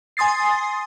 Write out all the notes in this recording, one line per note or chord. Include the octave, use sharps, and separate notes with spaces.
G#5 C6 D#6 A6 C7